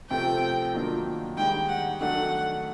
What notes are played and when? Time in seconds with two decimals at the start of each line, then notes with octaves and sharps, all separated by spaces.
0.10 C3 F3 A3 C4 G5
0.73 D#3 F#3 A#3 D4 F4
1.37 G#2 D#3 G3 G5
1.69 F#5
2.00 D#3 F#3 A3 D4 F#5